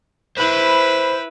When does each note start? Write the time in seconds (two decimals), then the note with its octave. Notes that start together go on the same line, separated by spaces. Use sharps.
0.37 E4 B4 C5 B5